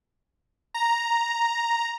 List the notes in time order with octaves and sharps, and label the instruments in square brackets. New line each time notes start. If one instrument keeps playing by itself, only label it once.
[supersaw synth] A#5